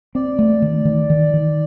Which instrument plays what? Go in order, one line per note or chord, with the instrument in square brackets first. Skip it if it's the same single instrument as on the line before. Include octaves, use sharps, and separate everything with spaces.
[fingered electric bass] C4 [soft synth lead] D5
[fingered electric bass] A3
D#3
D#3
D#3
D#3